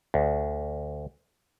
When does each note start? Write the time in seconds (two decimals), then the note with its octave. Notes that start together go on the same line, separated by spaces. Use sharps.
0.14 D2